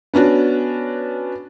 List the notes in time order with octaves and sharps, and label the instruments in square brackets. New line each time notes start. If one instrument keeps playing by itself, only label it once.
[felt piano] B3 C#4 D4 F#4